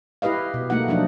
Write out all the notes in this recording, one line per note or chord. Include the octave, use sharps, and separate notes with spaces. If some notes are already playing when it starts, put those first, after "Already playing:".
E4 G4 B4 D#5 F5
B2
A3 A#3 D#4 F#5
F3 F#3 D4 D#4